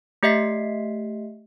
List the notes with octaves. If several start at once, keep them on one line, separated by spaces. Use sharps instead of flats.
A3 G4 D#5 E5 B6 C7